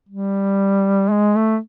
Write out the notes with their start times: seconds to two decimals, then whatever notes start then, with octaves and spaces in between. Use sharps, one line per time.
0.09 G3
1.11 G#3
1.36 A3